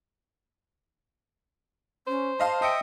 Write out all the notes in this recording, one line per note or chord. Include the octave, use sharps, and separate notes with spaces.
C#4 C5
D#5 F5 A5 C6
D#5 E5 G5 D#6 C#7 D7